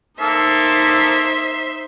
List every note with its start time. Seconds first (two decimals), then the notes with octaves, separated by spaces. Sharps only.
0.21 A#3 D#4 A4 C5 E5 C6